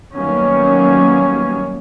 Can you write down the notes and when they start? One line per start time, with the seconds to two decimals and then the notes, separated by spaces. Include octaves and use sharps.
0.15 D#3 F#3 G3 A#3 B3 C#4